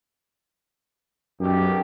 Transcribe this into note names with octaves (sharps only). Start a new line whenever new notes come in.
B1 F#2 G4